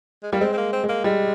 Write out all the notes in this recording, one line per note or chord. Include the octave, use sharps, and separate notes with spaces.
G#3
G3 A#3
G#3 C4
C4
A#3
C4
G#3
A#3
G3 G#3